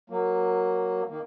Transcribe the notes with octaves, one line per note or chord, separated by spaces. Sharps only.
F#3 A#3
D#3 A#3